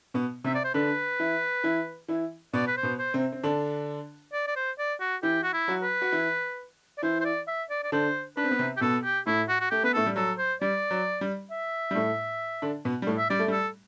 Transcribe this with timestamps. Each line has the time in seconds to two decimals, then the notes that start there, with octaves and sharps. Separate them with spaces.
0.14 B2 B3
0.44 C3 C4 E5
0.54 D5
0.64 C5
0.74 D3 D4 B4
1.20 E3 E4
1.64 E3 E4
2.08 E3 E4
2.53 B2 B3 D5
2.67 B4
2.77 C5
2.83 B2 B3
2.99 C5
3.14 C3 C4
3.32 C4
3.43 D3 D4
4.33 D5
4.47 D5
4.56 C5
4.78 D5
5.00 F#4
5.23 E3 E4 G4
5.43 F#4
5.53 E4
5.68 F#3 F#4
5.82 B4
6.02 F#4
6.12 E3 E4
6.98 D5
7.02 E3 E4 C5
7.21 C5
7.25 D5
7.47 E5
7.70 D5
7.83 D5
7.92 D3 D4 C5
8.37 D4 B4
8.44 C4
8.51 B3
8.59 C3 C4
8.77 G4
8.81 B2 B3 A4
9.04 G4
9.26 A2 A3 E4
9.48 F#4
9.60 F#4
9.71 A3 G4
9.84 B3 B4
9.94 A2 A3 A4
10.06 G3
10.16 F#3 A4
10.38 C5
10.61 G3 D5
10.91 F#3
11.21 G3
11.51 E5
11.91 G3
11.95 A2 A3
12.62 D3 D4
12.85 B2 B3
13.02 G3
13.07 A2 A3
13.18 E5
13.30 G3 D5
13.39 A3
13.48 G3
13.52 A4